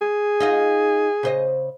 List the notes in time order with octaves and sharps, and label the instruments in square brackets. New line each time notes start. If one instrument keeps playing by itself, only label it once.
[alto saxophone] G#4
[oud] D#4 F4 D#5
C#3 C5 D#5